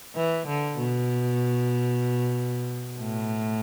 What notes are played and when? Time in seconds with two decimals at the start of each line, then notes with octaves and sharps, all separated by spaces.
0.16 E3
0.48 D3
0.79 B2
2.99 A2